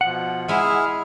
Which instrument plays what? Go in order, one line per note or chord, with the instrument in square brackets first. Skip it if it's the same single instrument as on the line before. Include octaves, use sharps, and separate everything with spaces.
[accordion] B2 F3 [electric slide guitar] F#5
[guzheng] G#3 E4 [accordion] G#4 E5 F6